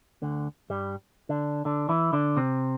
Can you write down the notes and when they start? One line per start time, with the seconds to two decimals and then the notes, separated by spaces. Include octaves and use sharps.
0.22 D2 D3
0.70 G2 G3
1.29 D3 D4
1.65 D3 D4
1.89 E3 E4
2.13 D3 D4
2.37 C3 C4